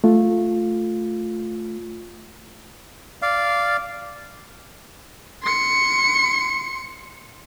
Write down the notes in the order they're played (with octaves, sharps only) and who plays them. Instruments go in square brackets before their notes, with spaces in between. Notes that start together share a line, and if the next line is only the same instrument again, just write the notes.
[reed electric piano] A3 F4
[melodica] D5 F5
[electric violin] C6 C#7